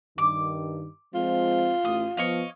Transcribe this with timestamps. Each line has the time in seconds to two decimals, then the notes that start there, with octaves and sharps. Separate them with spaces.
0.18 G2 D#3 D6
1.14 F3 G#3 C4 F4
1.85 A1 D#6
2.17 F3 B3 C#5 D#5 F5